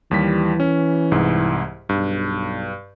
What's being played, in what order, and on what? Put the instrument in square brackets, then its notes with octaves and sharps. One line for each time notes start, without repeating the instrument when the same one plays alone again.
[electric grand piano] D#2 G3 B6 [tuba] E3
[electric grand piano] C#4
C2 G#2
[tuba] B1 [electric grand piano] G2